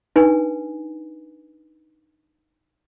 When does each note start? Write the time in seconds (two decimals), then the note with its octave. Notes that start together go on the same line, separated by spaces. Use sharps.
0.16 D4 D#4 B4 G#5